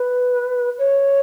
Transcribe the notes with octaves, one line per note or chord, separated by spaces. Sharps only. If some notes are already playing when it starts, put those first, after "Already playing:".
Already playing: B4
C#5